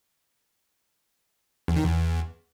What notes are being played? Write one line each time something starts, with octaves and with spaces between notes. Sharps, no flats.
E2
D#3
E2